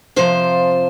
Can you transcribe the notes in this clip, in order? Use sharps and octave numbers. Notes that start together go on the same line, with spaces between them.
F2 C3 F3 C5